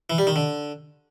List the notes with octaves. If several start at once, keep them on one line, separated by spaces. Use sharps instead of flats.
E3
G3
D#3
D3